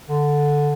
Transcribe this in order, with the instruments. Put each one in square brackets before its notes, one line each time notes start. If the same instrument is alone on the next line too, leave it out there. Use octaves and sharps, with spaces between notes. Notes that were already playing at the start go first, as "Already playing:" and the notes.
[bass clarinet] D3